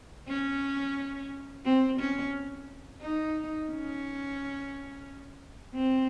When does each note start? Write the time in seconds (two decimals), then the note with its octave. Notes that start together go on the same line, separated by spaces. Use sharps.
0.29 C#4
1.65 C4
1.99 C#4
3.02 D#4
3.70 C#4
5.74 C4